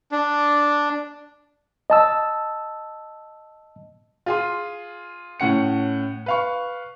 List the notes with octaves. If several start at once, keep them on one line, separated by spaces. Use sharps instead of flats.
D4
D#5 A5 E6
F4 G#4 C6
A2 C#4 F#5 C#7
B4 F5 C#6